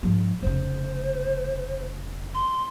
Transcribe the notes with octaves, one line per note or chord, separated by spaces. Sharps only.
G#2 F3
F1 C#3 C5
C6